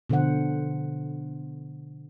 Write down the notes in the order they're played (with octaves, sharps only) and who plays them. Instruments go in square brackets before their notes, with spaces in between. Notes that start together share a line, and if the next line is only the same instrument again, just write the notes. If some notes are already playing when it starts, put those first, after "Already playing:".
[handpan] B2 D3 F3 C5 F#5